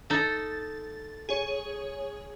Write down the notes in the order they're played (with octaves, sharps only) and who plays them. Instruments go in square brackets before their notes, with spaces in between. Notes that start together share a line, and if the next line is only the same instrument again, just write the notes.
[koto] D#4 A4 [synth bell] A6
[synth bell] G#4 C#5